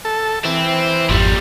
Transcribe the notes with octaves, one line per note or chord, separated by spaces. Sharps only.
A4
E3 C4
G#1 F2 A#2 G3